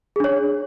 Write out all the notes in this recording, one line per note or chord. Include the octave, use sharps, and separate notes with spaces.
D4 G#4 C#5